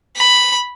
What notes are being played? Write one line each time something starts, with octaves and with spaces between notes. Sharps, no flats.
B5